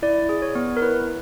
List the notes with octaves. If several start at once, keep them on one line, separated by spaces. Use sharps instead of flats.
E4 D5
G#4
C#5
B3
A#4
E4 B4